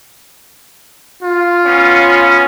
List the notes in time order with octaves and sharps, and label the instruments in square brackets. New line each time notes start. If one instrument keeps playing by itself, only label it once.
[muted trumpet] F4
[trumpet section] B3 C#4